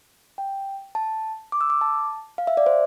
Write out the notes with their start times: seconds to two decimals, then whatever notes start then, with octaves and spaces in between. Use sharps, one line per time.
0.38 G5
0.95 A5
1.52 D6
1.61 E6
1.70 D6
1.81 A5
2.38 F5
2.47 E5
2.57 D5
2.66 C5